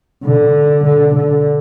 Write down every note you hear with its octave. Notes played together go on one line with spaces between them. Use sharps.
D3
D3
D3